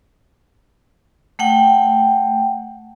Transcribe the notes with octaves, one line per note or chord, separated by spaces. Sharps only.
A3 F#5 G5